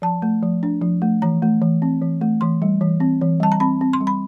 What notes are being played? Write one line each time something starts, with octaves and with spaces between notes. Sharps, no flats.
F3 A5
A3
F3
D4
F3
A3
E3 A#5
A3
E3
C4
E3
A3
E3 C6
G3
E3
C4
E3
G3 A5
A#5
C4 B5
C4
C6
G3
B5